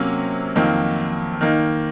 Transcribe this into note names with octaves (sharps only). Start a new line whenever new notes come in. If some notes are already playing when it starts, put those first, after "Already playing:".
Already playing: C3 F#3 A#3 C#4
F2 D#3 F#3 A#3
D#3 A#3 D#4